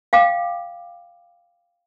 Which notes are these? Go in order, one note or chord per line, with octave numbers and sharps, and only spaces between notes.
F5 G5 D6